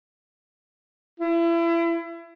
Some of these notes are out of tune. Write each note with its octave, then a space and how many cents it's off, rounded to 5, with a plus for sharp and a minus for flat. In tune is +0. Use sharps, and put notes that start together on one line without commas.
E4 +30